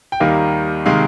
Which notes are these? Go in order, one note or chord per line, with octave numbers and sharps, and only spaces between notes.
G5
D#2 D#3 G3 A#3 F5
C3 D#3 G#3 F5